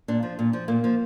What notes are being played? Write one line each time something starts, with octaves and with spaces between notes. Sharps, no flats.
A#2 D4
F3
A#2
F3
A#2 A#3
F3